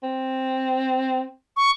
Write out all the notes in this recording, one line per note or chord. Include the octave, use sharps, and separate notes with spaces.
C4
C#6